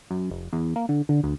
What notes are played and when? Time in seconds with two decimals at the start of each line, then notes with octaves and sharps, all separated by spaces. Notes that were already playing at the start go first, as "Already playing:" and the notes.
0.11 F#2
0.30 F1
0.53 E2
0.76 A#3
0.89 D3
1.09 D3
1.23 D2